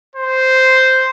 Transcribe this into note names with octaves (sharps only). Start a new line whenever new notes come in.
C5